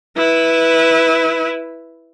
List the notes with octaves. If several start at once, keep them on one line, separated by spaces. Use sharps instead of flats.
E4 B4